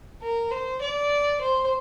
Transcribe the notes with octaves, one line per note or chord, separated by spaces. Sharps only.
A#4
C5
D5
C5